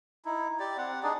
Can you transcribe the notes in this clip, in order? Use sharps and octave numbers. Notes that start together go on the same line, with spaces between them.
D#4 E4
G4 D5
C4 F#5
D4 D#4 G#4 D5